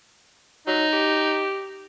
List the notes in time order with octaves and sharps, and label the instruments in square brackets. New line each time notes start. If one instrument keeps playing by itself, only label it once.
[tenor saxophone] F#3 [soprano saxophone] D#4
[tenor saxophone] G4